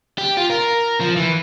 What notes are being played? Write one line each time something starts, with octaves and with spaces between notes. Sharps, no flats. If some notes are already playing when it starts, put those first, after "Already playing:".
G4
F4
A#4
F3
E3